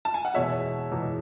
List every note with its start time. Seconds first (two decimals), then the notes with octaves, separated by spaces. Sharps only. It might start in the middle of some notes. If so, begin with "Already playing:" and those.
0.05 A5
0.14 G#5
0.25 F#5
0.34 E2 B2 G#3 C#5 E5
0.92 E2 B2 G#3